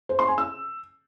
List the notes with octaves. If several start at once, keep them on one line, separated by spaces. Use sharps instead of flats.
C5
C6
G#5
E6